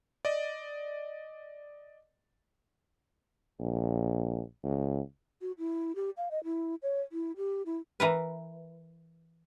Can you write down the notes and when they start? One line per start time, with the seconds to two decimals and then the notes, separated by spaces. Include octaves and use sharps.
0.25 D5 D#5
3.60 A#1
4.64 C#2
5.41 F#4
5.58 E4
5.96 G4
6.17 F5
6.31 D#5
6.44 E4
6.83 C#5
7.12 E4
7.37 G4
7.66 E4
8.00 E3 A#4 B4